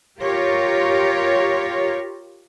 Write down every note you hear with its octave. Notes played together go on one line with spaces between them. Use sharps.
F4 G4 A#4 C#5